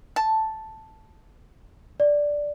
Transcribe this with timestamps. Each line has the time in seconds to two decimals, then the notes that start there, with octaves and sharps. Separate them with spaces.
0.16 A5
2.00 D5